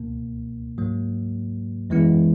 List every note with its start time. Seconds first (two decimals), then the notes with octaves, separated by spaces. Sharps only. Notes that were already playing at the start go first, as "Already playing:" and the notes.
Already playing: C#2 B2 A#3
0.78 G#2 F#3 A#3
1.90 F#2 E3 G#3 B3 E4